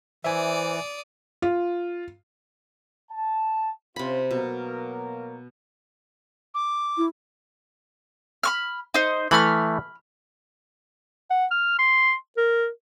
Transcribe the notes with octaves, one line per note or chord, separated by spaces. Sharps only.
E3 C5 D5 E5 G#5 D#6
F4
A5
C3 C#4 F4 B5
B2 F#3 A#3 A#4
D6
E4
B5 C#6 F6
D#4 C5
E3 A3 B5 F6
F#5
F6
C6
A#4